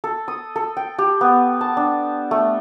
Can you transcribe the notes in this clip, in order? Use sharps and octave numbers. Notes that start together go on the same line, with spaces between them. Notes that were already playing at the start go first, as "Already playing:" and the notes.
A4
D#6
A4
G5
G4
B3
A5
D4
A3